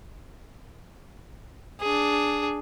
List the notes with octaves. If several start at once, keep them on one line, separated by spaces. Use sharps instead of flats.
D4 G#4